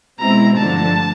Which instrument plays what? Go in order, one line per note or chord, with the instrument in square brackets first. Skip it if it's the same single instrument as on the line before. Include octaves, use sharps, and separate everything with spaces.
[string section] B2 G#3 C4 E4 [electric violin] A#5
[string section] G2 D3 F3 A3 [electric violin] A5